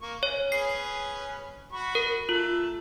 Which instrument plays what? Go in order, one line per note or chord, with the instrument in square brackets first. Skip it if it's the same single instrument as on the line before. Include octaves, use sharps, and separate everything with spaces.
[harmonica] A#3 C#6
[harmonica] C#4 [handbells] C#5
[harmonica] C#4 G#4 B4 [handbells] C7
[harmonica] F#4 B5 C#6
[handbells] A#4
[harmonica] A3 A4 [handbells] F4